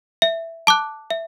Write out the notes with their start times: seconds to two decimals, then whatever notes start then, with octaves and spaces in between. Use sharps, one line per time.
0.22 E5
0.67 A5 D6 F#6
1.10 E5